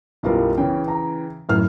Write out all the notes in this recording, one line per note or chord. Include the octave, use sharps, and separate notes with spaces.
B1 F#2 G3 E4 F4 A#4
C#3 E3 C#4 G5
A#5
F#2 A2 F6